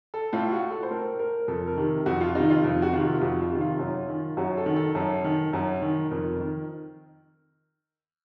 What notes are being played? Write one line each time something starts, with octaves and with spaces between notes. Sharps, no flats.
A4
A2 F4
F#4
A4
C5
A2 A#4
A#4
F2 A4
A#4
C3 D#3
F2 F#4
F4
C3 D#3 D#4
F4
F2
F#4
C3 D#3 F4
F2 F#4
F4
C3 D#3
F4
F#2
D#3
F#2 F#4
A4
D#3
A4
F#2
D#3
F#2
D#3
F2 A#4
D#3